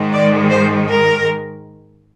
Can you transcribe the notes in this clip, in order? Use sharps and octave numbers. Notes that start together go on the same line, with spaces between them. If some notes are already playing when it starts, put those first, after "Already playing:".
Already playing: G#2 D#3 G#3
D5
C5
A#4